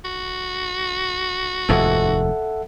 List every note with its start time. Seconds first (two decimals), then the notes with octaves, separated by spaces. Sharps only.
0.05 F#4
1.69 F1 D#2 G#2 A4 E5 F#5